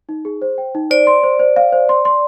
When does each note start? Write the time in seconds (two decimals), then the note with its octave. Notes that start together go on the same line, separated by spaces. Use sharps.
0.09 D#4
0.25 G#4
0.42 C5
0.58 G5
0.75 D#4
0.90 C5 D5
1.07 C6
1.23 C5
1.39 C5
1.56 F5
1.72 C5
1.89 C6
2.05 C6